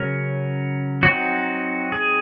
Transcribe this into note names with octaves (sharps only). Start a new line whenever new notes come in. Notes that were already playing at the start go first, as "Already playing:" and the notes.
Already playing: C#3 F#3 C#4 A#4
F#3 C4 D#4 F#4
G#4